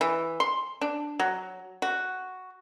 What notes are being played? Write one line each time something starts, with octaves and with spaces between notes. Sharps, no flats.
E3
C6
D4
F#3
F#4